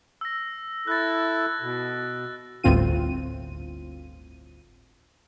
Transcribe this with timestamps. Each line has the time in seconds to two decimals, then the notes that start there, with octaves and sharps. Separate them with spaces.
0.21 E6 A#6
0.87 E4 A4 F#6 A6
1.61 B2
2.64 G1 D2 A2 C4 F4 D#7